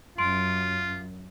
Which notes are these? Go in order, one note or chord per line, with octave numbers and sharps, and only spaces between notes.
F#2 F4 C6 D7